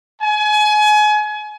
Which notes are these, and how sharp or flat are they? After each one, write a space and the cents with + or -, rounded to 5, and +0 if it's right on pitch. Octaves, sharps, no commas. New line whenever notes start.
G#5 +30